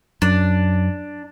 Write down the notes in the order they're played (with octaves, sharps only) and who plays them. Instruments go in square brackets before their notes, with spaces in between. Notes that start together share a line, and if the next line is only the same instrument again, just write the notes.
[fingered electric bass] F#2 [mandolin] D4